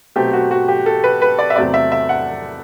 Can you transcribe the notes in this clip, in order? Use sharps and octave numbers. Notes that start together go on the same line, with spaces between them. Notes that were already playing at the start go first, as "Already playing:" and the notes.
B2 F#3 A3 C4 G4
F#4
F#4
G4
A4
B4
B4
D5
E5
E2 C3 F#3 A3 C4 D5
E5
E5
F#5